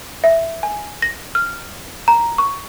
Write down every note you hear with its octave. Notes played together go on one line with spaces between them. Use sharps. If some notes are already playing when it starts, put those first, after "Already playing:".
E5
G#5
A#6
F6
A#5
C#6